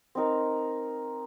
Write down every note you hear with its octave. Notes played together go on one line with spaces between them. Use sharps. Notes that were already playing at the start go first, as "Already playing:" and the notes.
C4 D#4 A#4